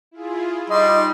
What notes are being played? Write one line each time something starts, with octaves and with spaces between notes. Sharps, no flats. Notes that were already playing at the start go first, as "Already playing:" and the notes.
E4 F4 G#4
G3 D#4 D#5 C6